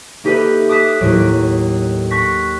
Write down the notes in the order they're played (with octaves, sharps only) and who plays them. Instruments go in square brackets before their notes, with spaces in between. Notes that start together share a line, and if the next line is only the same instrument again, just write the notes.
[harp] A#3 D#4 G4 A4 B4 E5
D6 D#6 F#6 B6 E7
D#2 A2 F#3 D7
C#6 F#6 A#6 B6